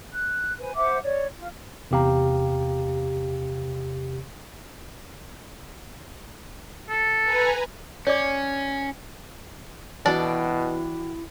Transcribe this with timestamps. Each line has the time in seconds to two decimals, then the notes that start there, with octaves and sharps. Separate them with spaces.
0.12 F#6
0.60 B4 C5 G#5
0.77 C5 E5 F#5 D6
1.04 C#5 D5
1.38 F4
1.91 E2 C3 G4 F5 A#5
6.90 A4
7.23 B4 G#5 A#5
8.07 C#4 C#5 D5 D6
10.06 B2 E3 D4 E4 F#4 A4 D5 G5